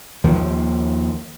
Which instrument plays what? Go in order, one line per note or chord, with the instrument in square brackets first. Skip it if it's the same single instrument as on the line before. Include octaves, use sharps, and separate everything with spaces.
[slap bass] D#2 D#3 F3